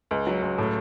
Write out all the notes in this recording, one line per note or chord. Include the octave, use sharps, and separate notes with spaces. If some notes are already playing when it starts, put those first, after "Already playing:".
C#2
F#3
C#2
A2